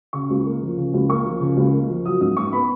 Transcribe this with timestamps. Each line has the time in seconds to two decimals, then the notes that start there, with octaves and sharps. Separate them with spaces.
0.13 C#3 C#6
0.30 C#2
0.46 A#3
0.62 F3
0.77 C#3
0.94 C#2
1.09 A#3 C#6
1.26 F3
1.41 C#3
1.57 C#2
1.73 A#3
1.89 F3
2.05 F#3 D#6
2.21 G#2 D#6
2.37 G#2 C#6
2.53 B3 B5